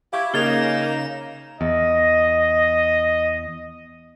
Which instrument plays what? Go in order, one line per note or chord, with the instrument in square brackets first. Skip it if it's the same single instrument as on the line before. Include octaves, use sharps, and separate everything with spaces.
[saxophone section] E4 [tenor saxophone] G4 [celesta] F5 C#6 G#6
[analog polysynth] C#3 A#5 E7 [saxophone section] A#3 [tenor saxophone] D#4 [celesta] G#6 A6 G7
[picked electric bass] E2 [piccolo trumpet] D#5